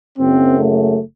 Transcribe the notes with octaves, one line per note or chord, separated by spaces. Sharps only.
F#1 F#2 C#3 C4
A3